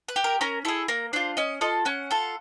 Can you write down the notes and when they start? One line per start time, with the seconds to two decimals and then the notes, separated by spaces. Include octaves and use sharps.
0.08 B4
0.16 G4
0.24 A#4
0.41 C#4 A#4
0.65 E4 G#4 A4
0.88 A#3 A#4
1.13 D4 F4 C5
1.37 C#4 D#5
1.61 F4 A4 D#5
1.85 C#4 F#5
2.11 F4 A4